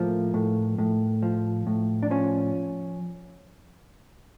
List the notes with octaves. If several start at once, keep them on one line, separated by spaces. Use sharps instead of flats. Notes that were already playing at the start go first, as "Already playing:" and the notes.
Already playing: A2 F3 A#3
A2
A2
F3
A2
D4
F3 C#4